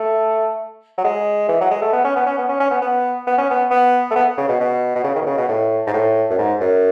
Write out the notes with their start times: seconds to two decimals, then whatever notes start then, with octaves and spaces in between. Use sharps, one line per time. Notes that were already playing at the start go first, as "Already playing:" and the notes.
Already playing: A3
0.98 F#3
1.04 G#3
1.49 E3
1.61 F#3
1.71 G#3
1.82 A3
1.93 B3
2.04 C#4
2.16 B3
2.26 C#4
2.38 B3
2.49 C#4
2.60 C#4
2.71 B3
2.82 B3
3.27 B3
3.38 C#4
3.50 B3
3.71 B3
4.11 A3
4.16 B3
4.37 C#3
4.49 B2
4.60 B2
4.95 B2
5.04 C#3
5.15 D#3
5.22 B2
5.26 C#3
5.38 B2
5.49 A2
5.87 G#2
5.94 A2
6.30 F#2
6.38 G#2
6.60 F#2